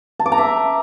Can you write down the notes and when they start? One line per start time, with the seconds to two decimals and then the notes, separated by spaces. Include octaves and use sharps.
0.20 A5
0.26 D6
0.32 A#5
0.38 E5